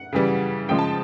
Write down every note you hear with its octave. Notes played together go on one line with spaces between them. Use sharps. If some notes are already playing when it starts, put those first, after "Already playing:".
Already playing: F#5
C#3 E3 G3
C#3 F3 G#3 G5
A5